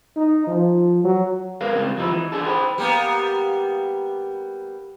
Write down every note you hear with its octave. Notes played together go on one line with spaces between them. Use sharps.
D#4
F3
F#3
G#2 A#4 B4 F5
C#2 C3 G3
F2 F3 D#4 E4
E3
D4 G#4 A4
C5 G5 B5
G3 A#3 B3